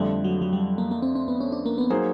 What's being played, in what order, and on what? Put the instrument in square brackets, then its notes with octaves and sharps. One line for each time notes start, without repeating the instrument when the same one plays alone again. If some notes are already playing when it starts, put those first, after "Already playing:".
Already playing: [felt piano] F2 D3 F3 A3 [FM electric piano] G3
[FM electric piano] F#3
F#3
G3
A#3
A#3
C4
C4
B3
C#4
D4
A#3
B3
[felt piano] F#3 A#3 D#4 G#4 C5